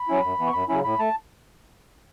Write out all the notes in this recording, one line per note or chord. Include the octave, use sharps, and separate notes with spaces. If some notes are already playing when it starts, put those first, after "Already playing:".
Already playing: B5
F#3 C#4 E4
F#2
E3 B3
C#6
F#2 B5
C#3 F#3 C#4 E4 B5
A2 B5
A3 A5